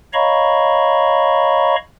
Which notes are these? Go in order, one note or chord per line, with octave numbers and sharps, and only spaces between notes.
C#5 D#5 F5 A#5 B5 C#6